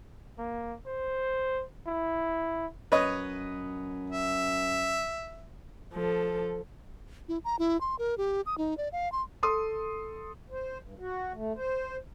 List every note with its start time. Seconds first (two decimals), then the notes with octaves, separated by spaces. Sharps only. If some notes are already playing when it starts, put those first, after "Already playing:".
0.38 A#3
0.87 C5
1.87 E4
2.92 F#2 B4 C#5 D#5
4.10 E5
5.94 F3 A4
7.29 E4
7.45 A#5
7.59 E4
7.81 C6
7.99 A#4
8.18 G4
8.46 D#6
8.58 D#4
8.78 D5
8.92 F5
9.12 C6
9.43 A4 C6 D#6
10.50 C5
10.83 G2
11.00 F#4
11.34 A3
11.56 C5